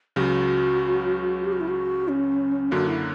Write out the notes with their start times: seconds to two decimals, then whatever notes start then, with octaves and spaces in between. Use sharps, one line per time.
0.16 C#2 C#3 F#3 F#4 G4
1.44 G4
1.52 F#4
1.60 E4
1.68 F#4
2.08 C#4
2.71 F#2 D3 F#3 A#3 F#4
2.87 E4